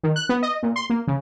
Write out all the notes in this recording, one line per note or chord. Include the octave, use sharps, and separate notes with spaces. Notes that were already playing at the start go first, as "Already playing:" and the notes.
D#3
F#6
B3
D#5
A#2
C6
A#3
C#3